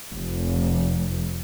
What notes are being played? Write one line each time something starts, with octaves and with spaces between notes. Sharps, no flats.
F1